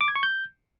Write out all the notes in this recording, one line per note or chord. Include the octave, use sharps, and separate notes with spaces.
D6
G#6
C#6
G6